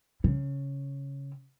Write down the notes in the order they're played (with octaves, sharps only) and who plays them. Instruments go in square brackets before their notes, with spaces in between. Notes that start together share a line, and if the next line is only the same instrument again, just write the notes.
[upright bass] C#3